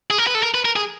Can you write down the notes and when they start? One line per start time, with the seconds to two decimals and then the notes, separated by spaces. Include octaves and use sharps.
0.10 G#4
0.18 A#4
0.27 B4
0.35 A4
0.43 A#4
0.54 B4
0.65 A#4
0.76 G#4